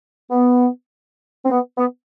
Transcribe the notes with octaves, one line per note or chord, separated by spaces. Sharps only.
B3
C4
B3
B3